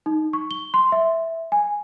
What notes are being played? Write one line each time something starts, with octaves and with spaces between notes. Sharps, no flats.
D#4
C#6
G7
C6
E5
G#5